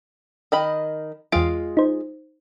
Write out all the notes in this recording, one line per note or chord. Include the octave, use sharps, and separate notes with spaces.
D#3 D#5 B5
E2 G#3 F4 F5 D7
D#4 C5